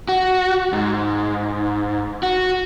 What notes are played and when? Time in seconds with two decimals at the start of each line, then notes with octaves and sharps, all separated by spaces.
0.09 F#4
0.73 G#2
2.23 F#4